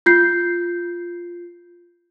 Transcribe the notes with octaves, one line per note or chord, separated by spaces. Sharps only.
F4 G6 C7